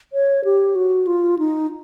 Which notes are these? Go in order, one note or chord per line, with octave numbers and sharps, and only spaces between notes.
C#5
G4
F#4
F4
D#4